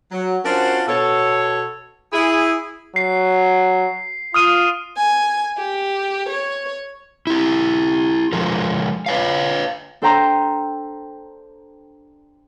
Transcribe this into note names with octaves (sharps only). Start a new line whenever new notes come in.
F#3
C#4 D4 F4 F#4 A#4 C5
B2 A4 C#5
E4 G#4
F#3 C7
F4 D#6 F6 D#7
G#5
G4
C#5
E4 G4
F3 G#3 A#4
B4 C#5 F5
D4 A4 C5 G5 A#5 C6